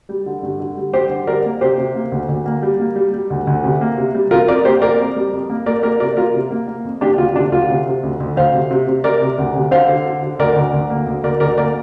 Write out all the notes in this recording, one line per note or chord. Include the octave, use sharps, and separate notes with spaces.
G3
D3
G2
D3
G3
G3 G4 C5
D3
G3 A#4 D5
A#3
C3 G4 C5
C3
A#3
D2
D2
A#3
G3
A#3
G3
G3
D2
D2
C3
A#3
C3
G3
C3 F4 A#4
F2 A#4 D5
A#3 G4 C5
A#3 A#4 D5
F2
G3
F2
A#3
A#3 A#4 D5
A#3 A#4 D5
C3 A#4 D5
A#3 F4 A#4
C3
A#3
A#3
F2
A#3 D4 G4
D2 F4
C3 D4
D2 F4
C3
C3
D2
D2
D2 C5 F5
C3
C3
C3
C3 A#4 D5
C3
D2
C3
D3 C5 F5
D3
D3
D3
D2 A#4 D5
D2
D2
A#3
D2
D2 A#4 D5
D2 A#4 D5
A#3 A#4 D5